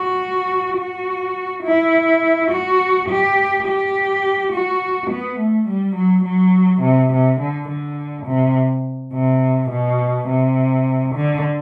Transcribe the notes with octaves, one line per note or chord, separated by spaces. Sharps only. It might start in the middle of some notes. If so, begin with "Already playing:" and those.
Already playing: F#4
F#4
E4
F#4
G4
G4
F#4
B3
A3
G3
F#3
F#3
C3
C3
D3
D3
C3
C3
B2
C3
D3